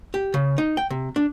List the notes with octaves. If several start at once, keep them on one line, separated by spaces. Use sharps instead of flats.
G4
C#3
D#4
G5
C3
D4